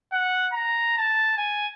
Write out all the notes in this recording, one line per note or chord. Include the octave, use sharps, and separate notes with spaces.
F#5
A#5
A5
G#5